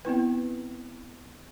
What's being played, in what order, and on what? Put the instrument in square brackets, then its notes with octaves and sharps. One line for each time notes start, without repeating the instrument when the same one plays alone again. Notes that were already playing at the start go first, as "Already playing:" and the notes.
[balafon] B3 C4 E4 B4